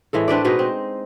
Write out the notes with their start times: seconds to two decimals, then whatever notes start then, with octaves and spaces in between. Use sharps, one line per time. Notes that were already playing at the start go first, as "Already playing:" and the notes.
0.13 A2 E3 G#3 A4
0.28 C4 D4 B4 D5
0.44 B2 G#3 D#4 B4
0.59 C4